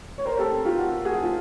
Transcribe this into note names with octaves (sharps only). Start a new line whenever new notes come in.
C#5
A#4 C5
G4 A4
F4 G4
F#4
F#4 G#4
F4